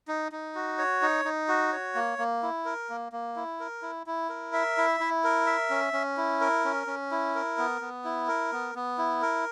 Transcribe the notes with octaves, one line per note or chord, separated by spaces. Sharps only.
D#4
D#4
F#4
C#5
D#4
D#4
F#4
C#5
A#3
A#3
E4
A#4
A#3
A#3
E4
A#4
E4
E4
A#4
E5
E4
E4
A#4
E5
C#4
C#4
E4
A#4
C#4
C#4
E4
A#4
B3
B3
E4
A#4
B3
B3
E4
A#4